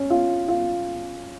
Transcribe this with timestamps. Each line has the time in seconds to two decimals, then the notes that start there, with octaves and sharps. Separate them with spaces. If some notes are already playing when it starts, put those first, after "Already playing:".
Already playing: C#4
0.10 F4
0.48 F4